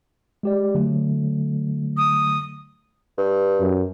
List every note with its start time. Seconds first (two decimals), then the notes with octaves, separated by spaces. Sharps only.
0.43 G#3 G4 D5
0.75 D3 F#3 A3
1.97 D#6
3.18 G2
3.60 F#2